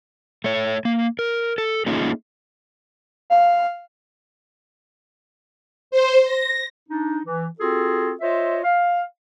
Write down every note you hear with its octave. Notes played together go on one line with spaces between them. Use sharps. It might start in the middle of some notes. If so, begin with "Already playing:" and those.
A3 C#5
A#3
A#4
A4
A3 A#3 C#4 D#4 F4 G#4
F5
C5
A#6
D4 D#4
E3
C4 F4 F#4 G#4 A4
F4 C5 C#5 D#5 E5
F5